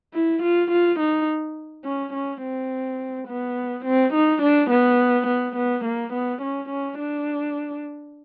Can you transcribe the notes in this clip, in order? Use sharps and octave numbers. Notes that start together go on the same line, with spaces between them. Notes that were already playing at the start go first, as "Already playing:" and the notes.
E4
F4
F4
D#4
C#4
C#4
C4
B3
C4
D#4
D4
B3
B3
B3
A#3
B3
C#4
C#4
D4